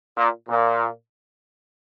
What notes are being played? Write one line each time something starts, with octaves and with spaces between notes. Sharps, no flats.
A#2
A#2